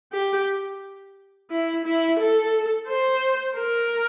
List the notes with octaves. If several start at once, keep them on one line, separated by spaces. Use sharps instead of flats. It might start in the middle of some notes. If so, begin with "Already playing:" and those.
G4
E4
E4
A4
C5
A#4